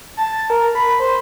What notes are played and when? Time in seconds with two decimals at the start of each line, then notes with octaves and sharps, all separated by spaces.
0.17 A5
0.50 A#4
0.75 B5
1.00 C5